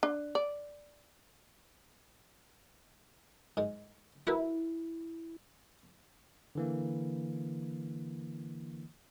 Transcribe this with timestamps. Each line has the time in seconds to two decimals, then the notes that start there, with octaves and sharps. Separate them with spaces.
0.03 D4
0.35 D5
3.57 G#2 G#3
4.27 E4 F#4 A#4 B4
6.55 D3 E3 A#3